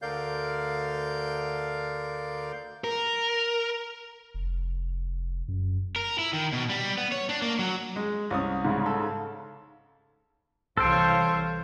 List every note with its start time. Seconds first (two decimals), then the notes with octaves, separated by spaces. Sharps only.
0.02 D2 D3 A#4 D5 F5 G6
2.84 A#4
4.34 F1
5.48 F#2
5.96 A#4
6.19 E4
6.33 D#3
6.53 B2
6.70 G3
6.97 B3
7.12 C#5
7.29 D4
7.42 A#3
7.59 F#3
7.96 G#3
8.30 C2 C#4 D#6
8.64 G#2 C#3
8.86 A4
10.77 C2 E3 A4 C5 C#5 F5 G5